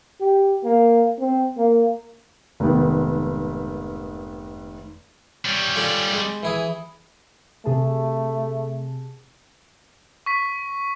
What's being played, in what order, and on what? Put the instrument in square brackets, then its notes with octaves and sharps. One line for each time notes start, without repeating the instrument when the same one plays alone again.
[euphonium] G4
A#3
C4
A#3
[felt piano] F1 G#2 D#3 B3
[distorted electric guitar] G3 C#4
[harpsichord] F4 A4 D5
G#3
E3 E4 G#4
[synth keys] C3 G#4 A5 [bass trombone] A3
[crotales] C#6 B6